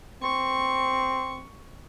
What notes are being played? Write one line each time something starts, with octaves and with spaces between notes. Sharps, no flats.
C4 C#6